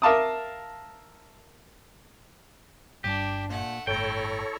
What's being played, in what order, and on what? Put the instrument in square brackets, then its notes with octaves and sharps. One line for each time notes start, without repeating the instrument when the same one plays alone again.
[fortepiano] A#4 E5 F5 A5 D6 D#6
[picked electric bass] G1 G2 G3 [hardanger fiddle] D4 [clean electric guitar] G4
[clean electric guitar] A#2 [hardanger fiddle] A3 F#5
[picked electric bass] G1 A2 [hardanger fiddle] E4 A#5 [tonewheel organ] A4 C#5 [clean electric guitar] G5